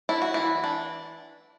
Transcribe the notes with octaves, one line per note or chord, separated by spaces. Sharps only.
D4 E4
F#4
E3 E4
D4